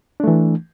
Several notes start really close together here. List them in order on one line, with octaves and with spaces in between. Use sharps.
D4 A3 E3